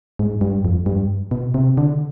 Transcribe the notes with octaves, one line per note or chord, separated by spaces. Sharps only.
G#2
G2
F2
G2
B2
C3
D3